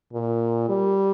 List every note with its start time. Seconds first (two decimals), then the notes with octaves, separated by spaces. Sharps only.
0.13 A#2
0.69 G3